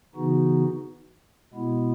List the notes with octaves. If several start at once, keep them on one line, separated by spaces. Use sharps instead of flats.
C#3 E3 B3 D#4 F#4
B2 G#3 B3 E4